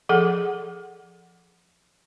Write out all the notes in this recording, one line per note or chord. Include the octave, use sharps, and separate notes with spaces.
F3 G#4 A4 F#5